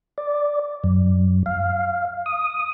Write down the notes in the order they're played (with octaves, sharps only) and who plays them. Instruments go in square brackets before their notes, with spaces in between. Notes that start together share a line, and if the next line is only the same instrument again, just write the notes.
[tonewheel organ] D5
F#2
F5
D#6